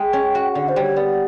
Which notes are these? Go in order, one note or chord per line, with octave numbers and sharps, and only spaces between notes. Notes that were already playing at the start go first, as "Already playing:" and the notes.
Already playing: G#3 G5
C#4
F#4
D3 F#5
C5
G3
C#5
B3 D5